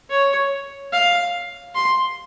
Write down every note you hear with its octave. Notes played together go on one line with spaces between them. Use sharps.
C#5
F5
C6